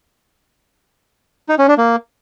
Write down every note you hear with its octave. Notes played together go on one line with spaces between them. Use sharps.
D#4
C#4
D4
A#3